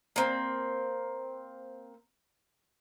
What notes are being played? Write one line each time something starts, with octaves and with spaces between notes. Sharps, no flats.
A#3 C4